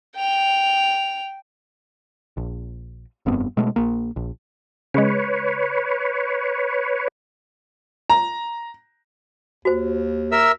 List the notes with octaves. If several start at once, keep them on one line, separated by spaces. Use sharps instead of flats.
G5 F7
A#1
F1 G2 B3 C4
B2 G#3 A3
A#1 A#3
A#1
C#3 G#3 B4 C#5
A#5
D#2 F#4 C5
A#4 E5 E6